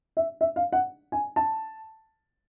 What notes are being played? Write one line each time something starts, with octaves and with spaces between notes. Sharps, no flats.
E5
E5
F5
F#5
G#5
A5